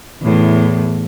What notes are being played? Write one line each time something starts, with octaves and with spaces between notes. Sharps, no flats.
E2 A2